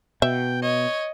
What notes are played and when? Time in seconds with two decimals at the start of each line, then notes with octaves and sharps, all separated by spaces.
0.22 B2 E5 G5
0.62 C#5 D#5